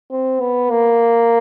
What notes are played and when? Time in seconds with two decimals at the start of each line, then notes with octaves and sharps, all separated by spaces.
0.11 C4
0.40 B3
0.71 A#3